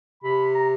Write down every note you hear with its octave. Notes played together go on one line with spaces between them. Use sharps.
C3 B5
A#5